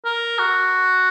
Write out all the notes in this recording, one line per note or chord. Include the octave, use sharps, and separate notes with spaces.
A#4
F#4